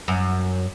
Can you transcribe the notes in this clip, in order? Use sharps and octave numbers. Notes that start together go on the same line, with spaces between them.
F#2